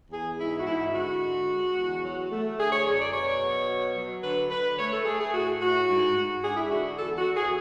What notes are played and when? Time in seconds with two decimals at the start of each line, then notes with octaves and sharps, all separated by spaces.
0.11 E2 G#4
0.39 G#2 E4
0.59 F#4
0.66 G#2 E4
0.94 D3 F#4
1.21 G#3
1.48 G#3
1.77 E2
2.04 F#3
2.31 A3
2.58 D3 G#4
2.72 C#5
2.86 F#2 C#5
2.99 D5
3.13 B2 C#5
3.41 B2
3.68 F#3
3.96 F#3
4.23 D3 B4
4.50 D3 B4
4.78 A3 C#5
4.92 A4
5.05 A3 G#4
5.20 G#4
5.33 A2 F#4
5.61 A2 F#4
5.89 G#2
6.16 G#2
6.43 D4 G#4
6.57 E4
6.71 D3 F#4
6.98 E2 A4
7.17 F#4
7.26 E2
7.35 G#4